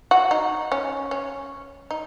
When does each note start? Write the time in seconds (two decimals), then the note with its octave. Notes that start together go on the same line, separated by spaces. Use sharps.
0.11 F#4
0.31 D#4
0.72 C#4
1.11 C#4
1.91 D#4